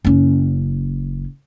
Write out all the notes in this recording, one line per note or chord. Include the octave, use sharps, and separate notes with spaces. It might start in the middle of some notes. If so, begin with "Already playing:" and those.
F#1 C#4